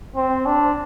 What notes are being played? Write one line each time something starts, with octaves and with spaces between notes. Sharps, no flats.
C4
D4